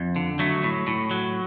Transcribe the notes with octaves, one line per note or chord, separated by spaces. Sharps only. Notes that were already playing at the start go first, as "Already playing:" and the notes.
Already playing: F2
D3
F#3 A3
A2
A2
F#3